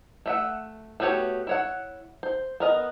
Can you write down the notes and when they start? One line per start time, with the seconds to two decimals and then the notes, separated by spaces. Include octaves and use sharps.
0.26 A3 E5 F#5
1.00 A3 B3 F#4 G4 C#5
1.47 E4 C#5 F#5
2.23 C5
2.60 B3 A#4 D#5